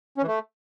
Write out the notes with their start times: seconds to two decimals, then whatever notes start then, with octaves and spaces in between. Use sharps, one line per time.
0.17 C#4
0.23 E3
0.28 A3